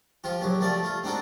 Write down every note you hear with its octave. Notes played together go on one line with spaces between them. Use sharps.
F3 F4 G4
A#1 F#3 G4
F3 A3 G4 D5
A3 F4
C4 D4 D#4 F#4 A4